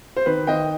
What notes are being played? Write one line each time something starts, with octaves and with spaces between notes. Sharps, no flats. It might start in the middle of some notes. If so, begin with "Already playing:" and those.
C5
D#3 B4
D#3 D#5 G5